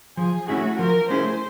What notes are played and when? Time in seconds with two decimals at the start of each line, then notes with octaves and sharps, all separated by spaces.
0.17 F3 G#4
0.48 A3 C#4 E4 F#4 G#4
0.79 F3 A#4
1.10 A3 C#4 E4 G#4 C5